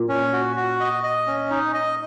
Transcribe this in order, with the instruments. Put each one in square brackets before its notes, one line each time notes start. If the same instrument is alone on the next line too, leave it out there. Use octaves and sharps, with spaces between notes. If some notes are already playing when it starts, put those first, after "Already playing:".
Already playing: [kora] A#2
[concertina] C#4
F#4
F#4
D#5
D#5
C#4
D#4
D#5